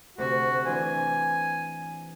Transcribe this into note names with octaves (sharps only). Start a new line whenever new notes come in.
D2 C3 F#4 C#6
E3 C4 D4 G#5